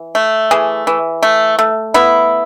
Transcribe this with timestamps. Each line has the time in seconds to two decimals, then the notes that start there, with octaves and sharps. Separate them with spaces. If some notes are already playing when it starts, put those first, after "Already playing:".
Already playing: E3
0.15 A3
0.51 E3 G#4
0.87 E3
1.23 A3
1.59 A3
1.94 B3 E4